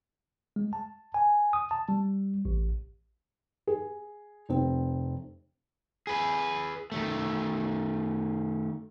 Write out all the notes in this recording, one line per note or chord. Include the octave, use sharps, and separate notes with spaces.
G#3
A5
G#5
D#6
A5
G3
A1
G#4
F1 C4
G#4 B4
D#3 A3